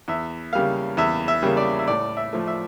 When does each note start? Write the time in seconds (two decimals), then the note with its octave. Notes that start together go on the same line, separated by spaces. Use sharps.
0.08 E2 E5
0.53 C#3 G3 A#3 F5
0.97 E2 E5
1.28 E5
1.42 C#3 G3 A#3
1.57 D5
1.79 E5
1.87 A2 D5
2.17 E5
2.33 F3 A3
2.47 E5